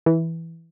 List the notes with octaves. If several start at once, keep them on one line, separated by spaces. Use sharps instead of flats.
E3